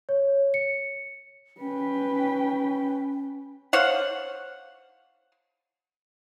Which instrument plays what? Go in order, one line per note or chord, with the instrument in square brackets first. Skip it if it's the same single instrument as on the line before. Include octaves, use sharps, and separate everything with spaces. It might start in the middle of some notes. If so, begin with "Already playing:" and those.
[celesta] C#5
C#7
[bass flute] C#4 [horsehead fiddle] B4 G5
[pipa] C5 C#5 F5 F#5